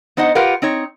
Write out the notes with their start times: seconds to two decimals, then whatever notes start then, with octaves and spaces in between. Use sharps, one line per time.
0.17 B3 D#4 C5 D#5 F#5
0.35 F4 G4 A#4 B4 F5 F#5
0.62 C4 D#4 C#5